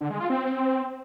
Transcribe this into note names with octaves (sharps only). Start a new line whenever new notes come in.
D3
G#3
F4
C4